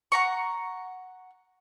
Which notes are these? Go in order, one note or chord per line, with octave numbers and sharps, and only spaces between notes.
F#5 A#5 C#6